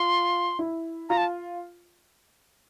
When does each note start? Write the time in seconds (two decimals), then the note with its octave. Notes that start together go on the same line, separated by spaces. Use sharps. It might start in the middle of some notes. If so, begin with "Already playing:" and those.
Already playing: F4 C6
0.59 E4
1.09 F4 A#5
1.17 A5